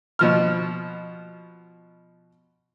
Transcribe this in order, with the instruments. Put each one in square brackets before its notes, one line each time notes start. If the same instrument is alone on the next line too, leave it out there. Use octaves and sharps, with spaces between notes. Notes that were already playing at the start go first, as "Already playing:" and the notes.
[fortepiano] B2 F3 F6